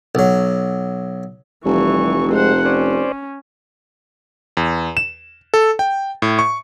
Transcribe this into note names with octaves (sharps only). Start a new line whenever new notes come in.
B1 F#3
F1 E3 G3 C#6
G#3 C5 F#5
C#4 C5 D5
E2
E7
A4
G5
A2
C#6